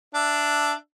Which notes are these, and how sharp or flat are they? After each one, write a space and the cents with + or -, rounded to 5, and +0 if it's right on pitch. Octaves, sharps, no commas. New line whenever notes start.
D4 +0 E5 +10